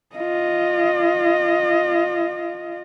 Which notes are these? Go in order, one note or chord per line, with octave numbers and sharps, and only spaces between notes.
F4 D#5